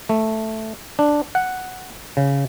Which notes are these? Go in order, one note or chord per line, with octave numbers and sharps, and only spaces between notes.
A3
D4
F#5
C#3